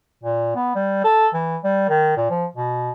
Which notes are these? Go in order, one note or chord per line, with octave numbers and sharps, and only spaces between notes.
A#2
B3
G3
A4
E3
G3
D#3
A#2
F3
B2